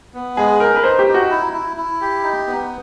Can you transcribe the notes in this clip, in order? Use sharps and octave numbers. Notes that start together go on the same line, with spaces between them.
B3
G#3 G#4
D#4 A#4
B4
D#4 C5
G4
D#4
F#4
E4
E4
E4
G4
D#4
B3